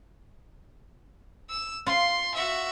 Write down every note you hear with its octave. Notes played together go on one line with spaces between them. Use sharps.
E6
F4 C6
F#4 E5